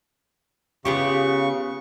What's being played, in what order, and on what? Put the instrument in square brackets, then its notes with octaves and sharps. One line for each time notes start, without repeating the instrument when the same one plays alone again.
[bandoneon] C#3 C#6 [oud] B3 F4 G4